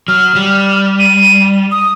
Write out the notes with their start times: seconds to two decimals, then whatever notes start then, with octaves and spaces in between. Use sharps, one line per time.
0.08 F#3 F6
0.36 G3
0.99 D#7
1.72 D#6